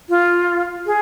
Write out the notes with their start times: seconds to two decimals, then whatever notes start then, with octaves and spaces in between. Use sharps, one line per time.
0.09 F4
0.87 G#4